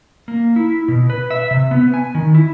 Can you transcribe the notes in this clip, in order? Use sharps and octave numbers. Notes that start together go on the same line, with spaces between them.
A#3
E4
B2
B4
E5
C3
B3
G#5
D#3
E4